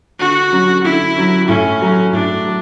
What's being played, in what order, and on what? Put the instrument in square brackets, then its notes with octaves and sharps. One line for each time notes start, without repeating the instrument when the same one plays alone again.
[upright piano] D3 [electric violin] F#4
[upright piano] F#3 C#4
[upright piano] D3 [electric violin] E4
[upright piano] F#3 C#4
[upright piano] A2 [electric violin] C#4
[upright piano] F#3 A3
[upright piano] A2 [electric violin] D4
[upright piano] F#3